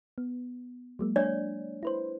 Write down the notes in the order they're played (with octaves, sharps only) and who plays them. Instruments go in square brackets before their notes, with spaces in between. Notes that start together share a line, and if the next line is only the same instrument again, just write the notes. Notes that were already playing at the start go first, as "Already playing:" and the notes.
[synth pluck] B3
F#3 G#3 A#3
[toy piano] D4 C#5 D5
[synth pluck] E4 B4 C5